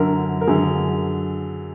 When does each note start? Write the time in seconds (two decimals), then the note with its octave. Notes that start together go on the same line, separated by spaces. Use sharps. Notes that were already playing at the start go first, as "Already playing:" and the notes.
Already playing: F#2 D3 A#4
0.41 A#4
0.48 F#2 D3 G#4